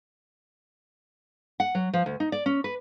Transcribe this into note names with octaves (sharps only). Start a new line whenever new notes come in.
F#5
F#3
F3
D2
D#4
D5
C#4
B4